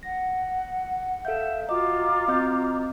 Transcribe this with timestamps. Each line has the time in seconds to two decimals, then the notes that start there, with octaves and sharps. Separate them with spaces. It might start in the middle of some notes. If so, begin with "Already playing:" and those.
0.03 F#5 A#6
1.25 A4 E5 F5 G6
1.69 F4 F#4 D#5 A#5 D6
2.28 C4 D#5 G6